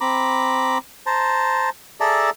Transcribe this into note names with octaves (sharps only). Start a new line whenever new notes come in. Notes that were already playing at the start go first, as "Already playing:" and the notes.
C4 A#5 B5 D6
C5 A5 A#5
G#4 A4 D5 E5 A5 A#5